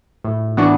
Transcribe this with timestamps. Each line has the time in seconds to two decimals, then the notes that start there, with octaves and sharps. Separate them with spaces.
0.24 A2
0.57 E3 B3 D4 F#4